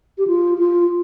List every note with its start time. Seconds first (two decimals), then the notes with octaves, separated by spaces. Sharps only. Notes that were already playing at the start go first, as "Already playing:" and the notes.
0.18 G4
0.27 F4
0.58 F4